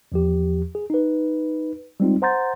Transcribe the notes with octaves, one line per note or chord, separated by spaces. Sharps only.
E2 F3 G4
G#4
D#4 B4
G3 G#3 C4 D#4 F4
C5 F#5 A#5 C6 G6 A6